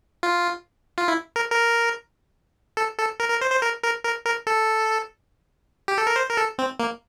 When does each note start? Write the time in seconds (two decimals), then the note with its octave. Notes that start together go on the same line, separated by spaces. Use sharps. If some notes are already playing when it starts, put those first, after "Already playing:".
0.23 F4
0.98 F4
1.08 E4
1.36 A#4
1.51 A#4
2.77 A4
2.99 A4
3.20 A#4
3.30 A#4
3.41 C5
3.52 C5
3.62 A#4
3.83 A#4
4.04 A#4
4.25 A#4
4.47 A4
5.88 G4
5.98 A4
6.07 A#4
6.16 C5
6.29 A#4
6.37 A4
6.59 C4
6.80 A#3